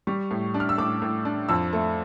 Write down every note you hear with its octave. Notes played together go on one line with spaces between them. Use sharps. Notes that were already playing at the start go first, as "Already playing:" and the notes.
G3 C#6
A2
D4
F6
E6
A2 D6
A2
D4
F2 E6
A3